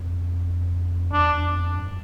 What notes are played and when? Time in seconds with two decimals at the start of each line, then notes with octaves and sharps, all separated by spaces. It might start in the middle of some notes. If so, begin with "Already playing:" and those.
Already playing: F2
1.11 E2 D4
1.44 F2
1.76 G2